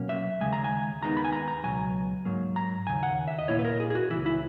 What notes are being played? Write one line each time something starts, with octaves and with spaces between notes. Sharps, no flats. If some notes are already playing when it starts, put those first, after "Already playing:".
Already playing: B2 F#3 A#3 C#4
E5
D#2 C#3 G#3 G#5
A#5
G#5
D#2 D#3 G#3 B3 D#4 A#5
B5
G#5
A#5
A#5
C#2 B2 F#3 G#5
G#2 F#3 A#3
A#5
D#2 C#3 G#5
F#5
E5
D#5
A#2 A#3 E4 C#5
B4
A#4
G#4
G#4
F#4
C#2 C#3 E3 E4
E4